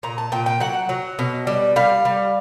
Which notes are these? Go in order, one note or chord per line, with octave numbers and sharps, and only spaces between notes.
A#2 A#5
A5
A#2 G5
G5
F#3 F#5
F#3
B2
G3
G3 F5
G3